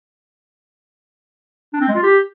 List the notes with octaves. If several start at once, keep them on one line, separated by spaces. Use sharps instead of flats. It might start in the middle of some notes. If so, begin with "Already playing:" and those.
D4
C4
G#3
F4
G4